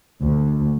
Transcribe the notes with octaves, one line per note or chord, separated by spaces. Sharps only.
D2